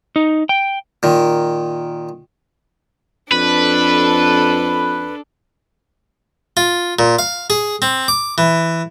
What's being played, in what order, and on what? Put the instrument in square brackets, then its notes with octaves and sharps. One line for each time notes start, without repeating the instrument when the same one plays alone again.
[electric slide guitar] D#4
G5
[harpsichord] A#2 D#3
[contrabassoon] F2 [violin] D4 A4 [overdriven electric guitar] B4
[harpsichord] F4
A#2
F5
G#4
C4
D6
E3